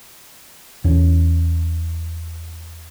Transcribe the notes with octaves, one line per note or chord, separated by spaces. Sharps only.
E2 C#4